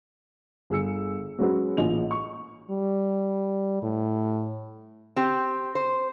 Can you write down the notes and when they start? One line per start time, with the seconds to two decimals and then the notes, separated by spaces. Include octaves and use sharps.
0.70 G1 G#4 E6 C#7
1.39 F#3 G#3 C#4 F#4 G#4 B4
1.77 A1 A#2 F4 D#5 F7
2.11 C#6
2.70 G3
3.82 A2
5.16 C4 G4
5.75 C5